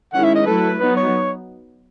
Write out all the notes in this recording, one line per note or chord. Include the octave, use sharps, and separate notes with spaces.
D#3 G#3 C#4 E4 F#5
E5
D#5
F#3 A3 E4 A4 B4
F#3 B3 D#4 B4
C#5